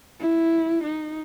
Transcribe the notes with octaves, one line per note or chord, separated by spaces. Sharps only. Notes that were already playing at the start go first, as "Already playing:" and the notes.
E4
D#4